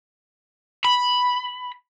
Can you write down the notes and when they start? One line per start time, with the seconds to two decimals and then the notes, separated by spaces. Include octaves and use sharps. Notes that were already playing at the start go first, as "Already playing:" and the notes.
0.85 B5